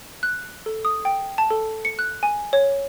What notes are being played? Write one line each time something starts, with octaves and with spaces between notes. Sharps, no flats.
F#6
A4
D#6
G5
A5
A4
C#7
F#6
G#5
C#5